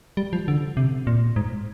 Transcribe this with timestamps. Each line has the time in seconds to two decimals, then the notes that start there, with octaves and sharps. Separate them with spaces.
0.17 G3
0.33 F3
0.48 D3
0.77 C3
1.07 A#2
1.36 G#2